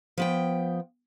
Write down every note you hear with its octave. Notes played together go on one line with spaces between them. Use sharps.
F3 B3 G5